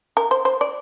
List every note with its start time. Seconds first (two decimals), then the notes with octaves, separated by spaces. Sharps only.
0.17 A#4
0.31 C5
0.45 C5
0.61 D5